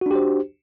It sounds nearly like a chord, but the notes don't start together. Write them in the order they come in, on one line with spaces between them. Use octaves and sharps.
F#4 D4 G4 C5